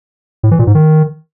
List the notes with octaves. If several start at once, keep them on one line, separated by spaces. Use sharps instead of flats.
A2
E3
A#2
G#2
D#3